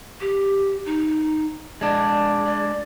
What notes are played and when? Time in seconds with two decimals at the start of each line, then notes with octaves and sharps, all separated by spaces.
0.21 G4
0.86 D#4
1.81 G#3 D4 D5
2.46 D5